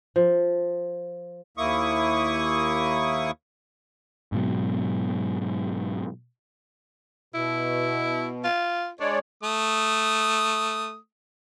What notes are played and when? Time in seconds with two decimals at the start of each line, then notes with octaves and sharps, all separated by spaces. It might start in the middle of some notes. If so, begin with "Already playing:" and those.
0.16 F3
1.58 D#2 A#3 E4 C#6 D#6
4.32 G#2 B2 F#3
7.34 B2 E4
8.44 F4
9.00 G#3 D4 C#5 D5
9.43 A3 D#6